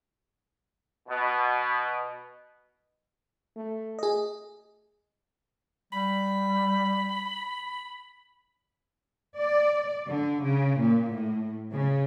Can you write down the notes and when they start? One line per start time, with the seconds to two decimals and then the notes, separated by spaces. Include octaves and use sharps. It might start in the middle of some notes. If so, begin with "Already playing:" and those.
1.08 B2
3.56 A3
3.99 G#4 D#5
5.93 G3 B5
9.37 D5
10.08 D3
10.42 C#3
10.79 A#2
11.12 A2
11.72 C#3